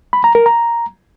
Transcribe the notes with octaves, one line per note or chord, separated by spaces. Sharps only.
B5
A#5
A#4
A#5